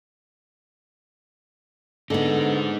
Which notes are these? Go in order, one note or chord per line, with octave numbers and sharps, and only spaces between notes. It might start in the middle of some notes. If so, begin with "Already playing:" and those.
D3 G#3 B3 D#4